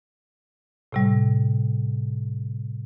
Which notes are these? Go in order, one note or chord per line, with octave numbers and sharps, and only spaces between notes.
A2 C3 G3